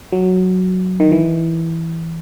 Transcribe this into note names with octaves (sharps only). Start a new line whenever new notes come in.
F#3
D#3
E3